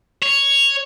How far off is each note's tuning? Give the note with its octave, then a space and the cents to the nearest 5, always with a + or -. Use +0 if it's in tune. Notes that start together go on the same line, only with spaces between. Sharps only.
C#5 +5